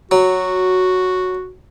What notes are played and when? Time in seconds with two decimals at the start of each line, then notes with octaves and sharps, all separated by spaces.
0.11 F#3 F#4